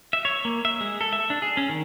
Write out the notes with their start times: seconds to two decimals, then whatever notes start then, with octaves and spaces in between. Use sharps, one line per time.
0.13 E5
0.25 C#5
0.45 A#3
0.65 E5
0.81 G#3
1.01 A4
1.13 E5
1.30 D4
1.42 G#4
1.57 C#4
1.69 D#3